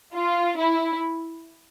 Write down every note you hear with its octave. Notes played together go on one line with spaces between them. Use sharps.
F4
E4